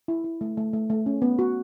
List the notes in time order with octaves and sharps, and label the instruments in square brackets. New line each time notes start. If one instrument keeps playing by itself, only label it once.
[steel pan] E4
E4
A3
A3
A3
A3
C#4
B3
F#4